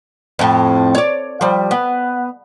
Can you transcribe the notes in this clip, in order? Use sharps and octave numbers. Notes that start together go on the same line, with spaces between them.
F2 A2
C#5 D5
F3 G3
B3